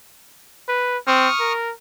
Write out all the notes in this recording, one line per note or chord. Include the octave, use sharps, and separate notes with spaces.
B4
C4 C#6 D#6 F6
A#4